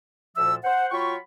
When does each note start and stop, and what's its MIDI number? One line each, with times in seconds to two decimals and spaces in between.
0.37 0.56 38
0.37 0.56 46
0.37 0.56 53
0.37 0.56 74
0.37 0.56 76
0.37 0.56 88
0.64 0.86 72
0.64 0.86 78
0.92 1.15 54
0.92 1.15 65
0.92 1.15 79
0.92 1.15 83
0.92 1.15 85